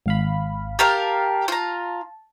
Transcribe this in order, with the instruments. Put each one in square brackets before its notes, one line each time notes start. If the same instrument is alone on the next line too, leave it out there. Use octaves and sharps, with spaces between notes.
[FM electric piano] G#1 F5 B5
[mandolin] G4 A#4 F5 [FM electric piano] A5
[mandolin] F4 A#5